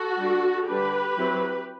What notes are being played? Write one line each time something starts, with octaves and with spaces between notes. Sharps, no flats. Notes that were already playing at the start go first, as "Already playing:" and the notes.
Already playing: F#4 A4
G3 D4
D3 G3 D4 G4 B4
F#3 C4 E4